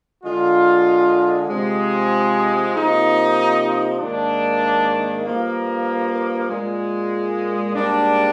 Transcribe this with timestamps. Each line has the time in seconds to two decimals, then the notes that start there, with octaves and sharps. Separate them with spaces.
0.24 D3 G#3 F4
1.49 C3 F3 G#3
2.74 C3 F3 A#3 D#4
3.99 G#2 D#3 A#3 D4
5.24 G2 F3 A#3
6.48 A#2 G#3
7.74 G#2 G3 A#3 D4